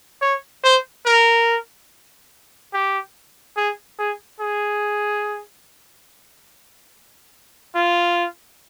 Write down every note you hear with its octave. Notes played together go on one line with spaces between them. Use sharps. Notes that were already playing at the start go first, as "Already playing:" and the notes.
C#5
C5
A#4
G4
G#4
G#4
G#4
F4